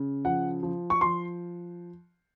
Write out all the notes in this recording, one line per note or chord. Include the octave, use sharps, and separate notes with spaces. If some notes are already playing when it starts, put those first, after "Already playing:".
Already playing: C#3
F3 F#5
F3
C#6
F3 C6